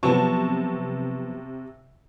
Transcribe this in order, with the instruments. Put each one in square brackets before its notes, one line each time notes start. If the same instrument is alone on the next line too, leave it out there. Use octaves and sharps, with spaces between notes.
[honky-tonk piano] C3 A5 C#6 [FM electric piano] F3 F#3 B3